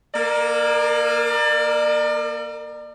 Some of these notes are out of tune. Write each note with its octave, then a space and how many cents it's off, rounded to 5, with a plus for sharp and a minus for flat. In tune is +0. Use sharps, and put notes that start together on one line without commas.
A#3 +15 A#4 -35 D5 +35